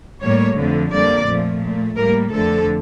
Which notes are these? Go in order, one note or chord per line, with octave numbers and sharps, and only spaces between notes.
A2 G3 A#3 C#5
F2 D3 F3 A3
F2 D3 G3 A#3 D5
A#2 F3 A3
A#2 A3
A2 G3 A#3 A#4
F2 D3 F3 A3 A4